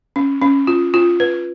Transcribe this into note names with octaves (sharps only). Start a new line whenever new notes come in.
C#4
C#4
F4
F4
B4